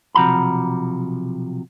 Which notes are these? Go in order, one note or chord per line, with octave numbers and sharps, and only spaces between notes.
B1 C3 F3 F#4 A#5 B5